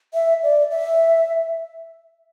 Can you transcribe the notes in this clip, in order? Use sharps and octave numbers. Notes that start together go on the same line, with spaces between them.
E5
D5
E5